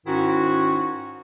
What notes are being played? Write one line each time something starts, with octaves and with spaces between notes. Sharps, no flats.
G#2 D#3 C#4 E4 F#4